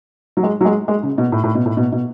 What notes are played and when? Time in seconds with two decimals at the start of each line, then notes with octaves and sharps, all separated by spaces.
0.37 F#3
0.43 G#3
0.61 F#3
0.65 G#3
0.88 G#3
1.03 C#3
1.18 B2
1.32 A2
1.44 A2
1.55 B2
1.66 A2
1.77 B2
1.92 B2